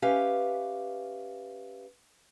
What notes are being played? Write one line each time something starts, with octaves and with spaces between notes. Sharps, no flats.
C#4 G4 B4 E5 F5